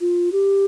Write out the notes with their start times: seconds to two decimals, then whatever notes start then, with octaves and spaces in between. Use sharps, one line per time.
0.01 F4
0.32 G4